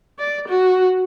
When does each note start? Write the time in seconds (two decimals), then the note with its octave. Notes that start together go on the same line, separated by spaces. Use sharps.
0.19 D5
0.48 F#4